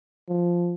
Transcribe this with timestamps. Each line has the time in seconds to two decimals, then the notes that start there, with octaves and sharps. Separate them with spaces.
0.28 F3